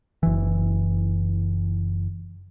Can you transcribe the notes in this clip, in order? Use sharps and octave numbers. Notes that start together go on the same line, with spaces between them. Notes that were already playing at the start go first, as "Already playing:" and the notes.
F#1 E3